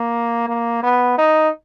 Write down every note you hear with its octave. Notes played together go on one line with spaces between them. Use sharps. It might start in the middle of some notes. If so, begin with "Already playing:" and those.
Already playing: A#3
A#3
B3
D#4